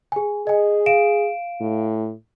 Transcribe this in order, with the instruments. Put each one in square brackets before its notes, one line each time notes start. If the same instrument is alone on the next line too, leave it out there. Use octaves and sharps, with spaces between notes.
[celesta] G#4 G#5
[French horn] G#4 [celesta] D#5 G#5
[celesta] F5 D7 E7
[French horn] A2